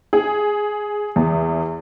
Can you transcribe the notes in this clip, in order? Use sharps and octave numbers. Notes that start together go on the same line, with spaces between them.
G#4
E2